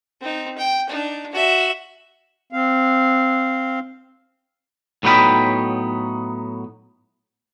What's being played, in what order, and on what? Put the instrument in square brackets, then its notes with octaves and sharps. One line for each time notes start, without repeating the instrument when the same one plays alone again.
[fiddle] C4 D#4
G5
D4 D#4
F#4 E5
[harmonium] C4 F5
[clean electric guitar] A2 F#3 B3 D#4 G5 B5